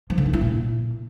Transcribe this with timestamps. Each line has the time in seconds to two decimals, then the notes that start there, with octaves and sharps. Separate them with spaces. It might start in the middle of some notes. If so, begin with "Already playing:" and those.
0.10 F3
0.18 D3
0.26 D#4
0.33 E4
0.41 A#2